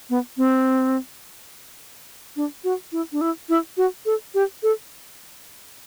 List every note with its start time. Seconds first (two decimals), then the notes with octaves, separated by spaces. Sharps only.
0.10 B3
0.37 C4
2.36 D4
2.64 F#4
2.92 E4
3.12 D4
3.21 E4
3.49 E4
3.77 F#4
4.06 A4
4.34 G4
4.63 A4